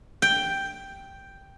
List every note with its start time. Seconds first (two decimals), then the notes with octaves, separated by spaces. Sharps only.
0.22 G5